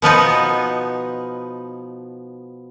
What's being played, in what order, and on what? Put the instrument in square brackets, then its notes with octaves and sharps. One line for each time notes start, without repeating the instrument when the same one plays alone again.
[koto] B2 F3 B3 D#4